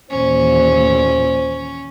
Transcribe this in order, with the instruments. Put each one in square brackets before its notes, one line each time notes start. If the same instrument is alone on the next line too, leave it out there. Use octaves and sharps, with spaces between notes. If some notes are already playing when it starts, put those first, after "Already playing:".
[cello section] D#2 A#2 E3 [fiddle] C#4 [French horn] C5